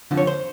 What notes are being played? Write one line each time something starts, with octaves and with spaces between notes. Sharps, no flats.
F2 D3 F3
C#5
C5